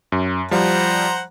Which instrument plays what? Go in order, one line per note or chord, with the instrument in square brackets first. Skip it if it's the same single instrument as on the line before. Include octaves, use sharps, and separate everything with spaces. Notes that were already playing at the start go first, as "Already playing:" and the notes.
[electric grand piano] F#2
[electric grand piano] F3 G3 [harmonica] C5 F#5 A#5